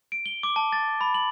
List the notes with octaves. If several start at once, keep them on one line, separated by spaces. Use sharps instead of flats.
D7
G7
D6
A5
A6
B5
F#7